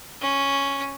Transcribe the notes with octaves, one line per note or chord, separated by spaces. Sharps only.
C#4